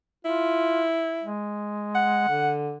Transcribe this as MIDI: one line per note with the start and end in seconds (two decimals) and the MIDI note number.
0.25 1.28 64
0.25 0.87 65
1.22 2.27 56
1.95 2.52 78
2.29 2.76 50